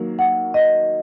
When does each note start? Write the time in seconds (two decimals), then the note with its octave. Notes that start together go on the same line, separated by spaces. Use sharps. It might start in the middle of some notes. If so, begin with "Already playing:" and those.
Already playing: D#3 F#3 A#3
0.19 F#5
0.54 D#5